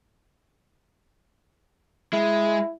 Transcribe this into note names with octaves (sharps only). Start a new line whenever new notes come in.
G#3 E4